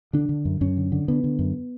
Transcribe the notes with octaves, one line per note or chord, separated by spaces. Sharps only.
D3 D4
D3
F#2
F#2 C#4
D3
D3
D3 B3
D3
F#2